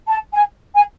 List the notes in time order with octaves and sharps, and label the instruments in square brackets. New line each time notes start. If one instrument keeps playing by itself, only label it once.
[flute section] A5
G#5
G#5